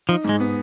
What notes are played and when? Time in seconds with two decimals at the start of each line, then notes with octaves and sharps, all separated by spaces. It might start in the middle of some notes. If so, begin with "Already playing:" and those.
0.09 F3 D#4
0.24 G#2 G#3
0.40 B3